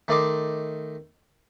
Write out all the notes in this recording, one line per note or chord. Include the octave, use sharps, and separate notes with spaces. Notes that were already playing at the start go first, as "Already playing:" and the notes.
D#3 A3 D5 D#5 C6 D6